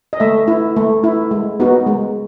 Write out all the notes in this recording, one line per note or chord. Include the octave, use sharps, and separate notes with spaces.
D#5
A3 E5
E4
A3
E4
G#3
B3 D#4 F#4
G#3